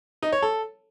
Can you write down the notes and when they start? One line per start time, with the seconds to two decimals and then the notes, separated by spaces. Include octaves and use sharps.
0.23 D#4
0.32 C#5
0.42 A4